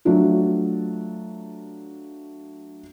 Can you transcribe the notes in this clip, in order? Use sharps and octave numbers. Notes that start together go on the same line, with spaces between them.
F#3 A3 D4 F4